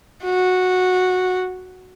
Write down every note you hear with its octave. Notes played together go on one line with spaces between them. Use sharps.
F#4